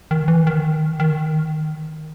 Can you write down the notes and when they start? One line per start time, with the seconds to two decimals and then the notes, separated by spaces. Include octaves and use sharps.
0.11 D#3
0.28 E3
0.47 D#3
1.00 D#3